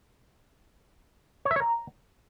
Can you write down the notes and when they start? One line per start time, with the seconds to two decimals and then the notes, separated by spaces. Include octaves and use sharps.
1.45 C#5
1.51 E5
1.56 C#5
1.61 A#5